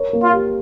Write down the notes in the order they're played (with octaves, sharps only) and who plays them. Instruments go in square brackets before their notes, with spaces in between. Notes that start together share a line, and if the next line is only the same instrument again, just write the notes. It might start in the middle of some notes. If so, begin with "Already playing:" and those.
Already playing: [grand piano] A#4 C#5
A#3
[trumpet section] F4
[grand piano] G4